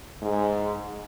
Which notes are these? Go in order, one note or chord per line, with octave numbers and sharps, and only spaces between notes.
G#2